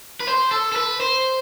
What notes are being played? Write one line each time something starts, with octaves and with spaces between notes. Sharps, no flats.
B4
C5
A4
A4
B4
C5